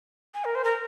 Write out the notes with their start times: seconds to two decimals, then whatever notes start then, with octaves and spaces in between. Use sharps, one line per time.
0.34 G#5
0.45 A#4
0.55 C5
0.64 A#4